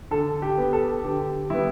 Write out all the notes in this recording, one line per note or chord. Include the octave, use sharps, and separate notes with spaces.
D3 A4
G4
B3
A4
D3 G4
G3 B3 E4